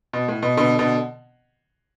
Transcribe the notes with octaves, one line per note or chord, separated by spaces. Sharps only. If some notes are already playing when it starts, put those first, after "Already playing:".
B2
A2
B2
B2 D3
B2 D3